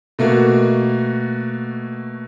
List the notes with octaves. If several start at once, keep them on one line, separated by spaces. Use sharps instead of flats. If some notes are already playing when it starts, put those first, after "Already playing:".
B2 A3 A#3 F#4